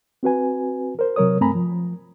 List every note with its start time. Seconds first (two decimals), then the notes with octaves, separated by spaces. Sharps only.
0.23 C4 F#4 B4 G#5
0.99 A#4 C5
1.16 C3 F#3 A#4 C#5 D#6
1.41 G2 A3 C4 G#5 A#5 B5
1.55 F3